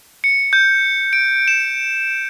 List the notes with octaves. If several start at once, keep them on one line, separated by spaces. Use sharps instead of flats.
C#7
G6
D7
E7